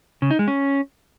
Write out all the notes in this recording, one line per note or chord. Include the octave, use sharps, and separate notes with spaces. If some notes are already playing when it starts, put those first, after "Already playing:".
C#3
D#4
G#3
C#4